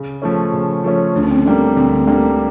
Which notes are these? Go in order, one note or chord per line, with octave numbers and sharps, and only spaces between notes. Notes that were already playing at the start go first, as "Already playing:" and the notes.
Already playing: C#3
F3 A3 C#4
C#3
F3 A3 C#4
D2 D4
C#4
C4
C#4
D3 G3 A#3
D2 C4
D3 G3 A3 A#3